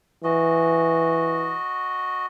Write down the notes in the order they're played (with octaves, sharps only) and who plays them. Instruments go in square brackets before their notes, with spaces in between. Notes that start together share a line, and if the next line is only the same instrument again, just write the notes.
[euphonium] E3 [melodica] F#4 D#5